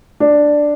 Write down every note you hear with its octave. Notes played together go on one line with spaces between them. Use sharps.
D4